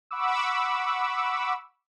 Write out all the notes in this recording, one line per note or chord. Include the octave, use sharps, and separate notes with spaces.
F#5 B5 C#6 D6 E6